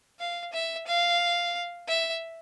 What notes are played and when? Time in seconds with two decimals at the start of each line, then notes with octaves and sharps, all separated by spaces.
0.19 F5
0.53 E5
0.87 F5
1.88 E5